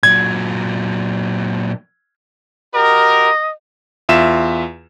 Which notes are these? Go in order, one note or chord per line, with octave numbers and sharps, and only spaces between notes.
A#2 F#3 G#6
F#4 G4 A#4 D#5
E2 F4 E5 E7